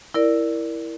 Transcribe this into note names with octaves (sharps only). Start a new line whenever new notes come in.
E4 A#4 D5